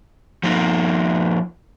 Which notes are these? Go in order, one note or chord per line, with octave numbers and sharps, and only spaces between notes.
F3 A#3 D#4